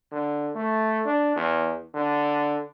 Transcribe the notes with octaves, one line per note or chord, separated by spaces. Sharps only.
D3
A3
D4
E2
D3